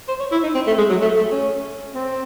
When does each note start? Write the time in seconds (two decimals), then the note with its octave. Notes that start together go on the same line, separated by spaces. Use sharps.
0.08 C5
0.20 C#5
0.32 E4
0.43 D#4
0.54 C4
0.67 A3
0.78 G#3
0.90 F#3
1.01 A3
1.16 A3
1.32 C#4
1.95 C4